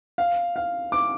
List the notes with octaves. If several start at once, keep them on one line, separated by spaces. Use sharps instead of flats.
F5
F5
D6